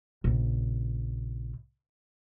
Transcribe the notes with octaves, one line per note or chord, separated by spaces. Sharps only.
A#1 C#3